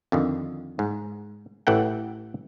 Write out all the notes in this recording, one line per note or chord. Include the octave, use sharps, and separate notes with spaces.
F2 D3 D#3
G#2
A1 E3 A4 F#5 G5